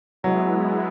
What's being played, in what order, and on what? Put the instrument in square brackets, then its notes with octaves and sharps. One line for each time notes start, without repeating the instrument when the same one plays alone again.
[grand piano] F#3 [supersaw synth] G#3 B3 E4